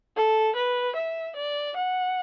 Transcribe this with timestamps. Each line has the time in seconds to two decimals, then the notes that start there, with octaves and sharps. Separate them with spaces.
0.16 A4
0.55 B4
0.95 E5
1.35 D5
1.76 F#5